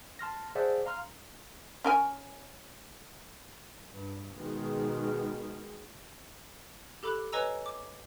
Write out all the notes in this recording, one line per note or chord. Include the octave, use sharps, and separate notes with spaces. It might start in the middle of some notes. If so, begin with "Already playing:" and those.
A5 C6 F6 A#6
G#4 C5 D5 E5 F#5 A5
F5 A#5 C6 F6
C#4 A#4 G#5
G2
B2 D#3 G#3
G4 A4 B5 D6 F#6
B4 C#5 D#5 G#5 A#5 E6
D6